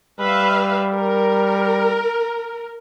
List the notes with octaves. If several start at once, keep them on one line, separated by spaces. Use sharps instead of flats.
G3 B4 E5 F5
A#4